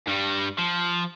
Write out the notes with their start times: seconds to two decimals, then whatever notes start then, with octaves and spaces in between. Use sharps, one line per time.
0.07 G2 G3
0.59 F3